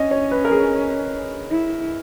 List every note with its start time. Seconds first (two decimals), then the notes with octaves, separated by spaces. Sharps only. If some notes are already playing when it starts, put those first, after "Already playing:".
Already playing: C#4 C#5 D#5
0.11 C#5
0.31 B4
0.45 A#4
0.51 G#4
1.50 E4